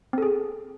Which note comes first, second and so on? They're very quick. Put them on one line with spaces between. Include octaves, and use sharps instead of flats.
C4 A4 G#4